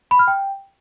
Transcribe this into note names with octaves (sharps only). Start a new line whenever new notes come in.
B5
F6
G5